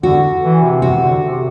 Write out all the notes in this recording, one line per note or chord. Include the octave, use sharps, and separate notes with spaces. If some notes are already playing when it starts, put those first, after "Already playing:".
D3 F#4
E3
C3
C3 F#4
D3
C3